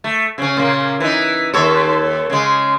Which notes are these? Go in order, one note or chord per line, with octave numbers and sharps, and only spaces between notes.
A3
C#3 C#4
A#2 C#3 A#3
E3 D#4
D#2 A4 C#5
C#3 G#3